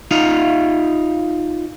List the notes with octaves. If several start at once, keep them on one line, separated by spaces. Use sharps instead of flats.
D#4 F4 F5